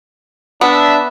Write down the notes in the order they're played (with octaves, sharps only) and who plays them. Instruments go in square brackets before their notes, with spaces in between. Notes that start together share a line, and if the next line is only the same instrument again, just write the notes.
[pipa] B3 [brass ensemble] D4 E5